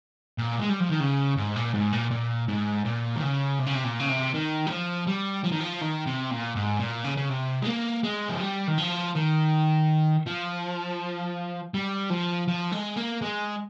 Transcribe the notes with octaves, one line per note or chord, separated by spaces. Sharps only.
A#2
G#3
G3
F3
D#3
C#3
G#2
A#2
G#2
A#2
A#2
G#2
A#2
D#3
C#3
C3
C#3
C3
A#2
C#3
C3
D#3
G3
F3
G3
F3
D#3
F3
D#3
C3
A#2
G#2
A#2
C#3
C#3
C3
G#3
A#3
G#3
F3
G3
D#3
F3
D#3
F3
G3
F3
F3
G#3
A#3
G#3